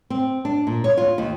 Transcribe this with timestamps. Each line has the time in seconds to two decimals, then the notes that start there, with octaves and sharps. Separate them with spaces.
0.10 C4
0.45 D4
0.67 A#2
0.84 C#5
0.97 F4
1.18 D#2